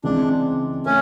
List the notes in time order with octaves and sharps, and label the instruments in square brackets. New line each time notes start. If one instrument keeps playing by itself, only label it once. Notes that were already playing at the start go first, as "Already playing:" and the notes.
[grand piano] C#3 E3 G#3 C4 [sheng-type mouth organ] D4
[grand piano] A3 [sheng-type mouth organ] C#4